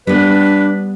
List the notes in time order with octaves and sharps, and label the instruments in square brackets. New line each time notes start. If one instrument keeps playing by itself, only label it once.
[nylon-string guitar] G3 B3 [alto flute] D4 [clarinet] B4